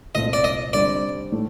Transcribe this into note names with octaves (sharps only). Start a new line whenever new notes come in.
C2 A#2 A3 C4 F4 D#5
D5
D#5
D3 G3 C4 D5
A2 A3